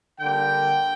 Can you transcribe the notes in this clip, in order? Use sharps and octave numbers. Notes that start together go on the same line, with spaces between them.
D3 G3 A#3 G5